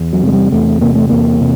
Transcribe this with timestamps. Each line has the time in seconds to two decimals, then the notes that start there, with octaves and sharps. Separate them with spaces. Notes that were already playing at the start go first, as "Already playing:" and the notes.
Already playing: E2
0.13 F#3
0.22 C3
0.27 G#3
0.33 G3
0.52 E2 A3
0.81 C3 A#3
0.95 A3
1.09 E2 A#3
1.40 C3